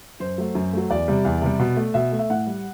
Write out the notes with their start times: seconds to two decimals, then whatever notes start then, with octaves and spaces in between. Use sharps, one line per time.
0.20 F#2 C5
0.38 F#3 A3
0.55 F#2
0.73 F#3 A3
0.90 E2 D5
1.08 C3 G3
1.25 E2
1.42 C3 G3
1.59 B2
1.77 A3
1.94 B2 E5
2.12 A3
2.19 E5
2.30 A2 F#5
2.47 G3